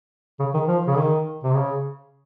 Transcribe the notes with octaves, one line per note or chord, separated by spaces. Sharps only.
C#3
D#3
F3
C#3
D#3
C3
C#3